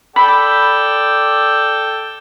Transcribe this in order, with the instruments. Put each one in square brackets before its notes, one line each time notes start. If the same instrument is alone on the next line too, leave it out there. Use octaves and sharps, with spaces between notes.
[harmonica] A4 D5 G5 [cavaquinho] B5